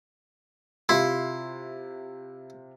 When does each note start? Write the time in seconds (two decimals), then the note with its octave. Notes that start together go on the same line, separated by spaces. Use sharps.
0.89 C3 E4 F4 C6